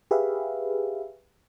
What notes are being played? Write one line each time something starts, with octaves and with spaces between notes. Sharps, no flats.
G4 G#4 B4 E5 F5